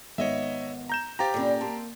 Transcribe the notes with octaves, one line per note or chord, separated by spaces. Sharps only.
G#1 B3 C#5 D#5 E5
A#5 G6 E7
G4 C5 F5 G5 A#5 A6
A#2 D3 G3 C#4
A#3 C4 A5